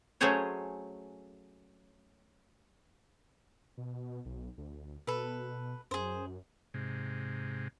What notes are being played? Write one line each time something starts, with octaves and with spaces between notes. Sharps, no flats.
F#3 A3 C#4 G#4 C5 C#5
B2
B1
D2
B2 A4 B4
F#2 G#4 C5
G#2 C3